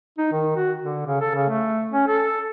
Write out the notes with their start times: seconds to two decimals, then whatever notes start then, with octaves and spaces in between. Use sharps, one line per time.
0.18 D#4
0.32 D#3
0.56 F#4
0.82 D3
1.07 C#3
1.21 A4
1.35 C#3
1.49 A3
1.92 C#4
2.08 A4